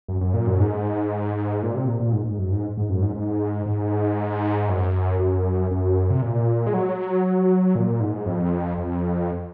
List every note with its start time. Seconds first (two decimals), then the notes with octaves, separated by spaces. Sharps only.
0.08 F#2
0.21 F#2
0.34 A#2
0.47 F#2
0.60 G#2
1.63 A#2
1.75 C3
1.88 A#2
2.00 A#2
2.13 G#2
2.25 G#2
2.38 F#2
2.52 G#2
2.77 G#2
2.90 F#2
3.02 G#2
3.16 G#2
3.66 G#2
4.69 F#2
5.19 F#2
5.71 F#2
6.10 C3
6.22 A#2
6.66 G#3
6.74 F#3
7.75 A#2
8.00 G#2
8.26 F2
8.78 F2